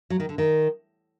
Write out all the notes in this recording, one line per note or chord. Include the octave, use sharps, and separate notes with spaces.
F#3
D#3
D3
D#3